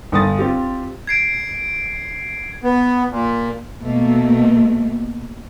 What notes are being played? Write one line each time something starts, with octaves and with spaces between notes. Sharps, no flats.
G1 D#6 A6
C4 F4 G4
G#6 C7 D7
B3
A#2
B2 A3 A#3